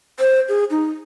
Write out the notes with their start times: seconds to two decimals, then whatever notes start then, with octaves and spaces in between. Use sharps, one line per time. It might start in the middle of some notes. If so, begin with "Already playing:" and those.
0.20 C5
0.49 G#4
0.71 D#4